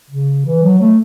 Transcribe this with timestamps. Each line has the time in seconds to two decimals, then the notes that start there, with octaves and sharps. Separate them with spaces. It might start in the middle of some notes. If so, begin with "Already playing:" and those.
0.10 C#3
0.46 E3
0.63 F#3
0.81 A3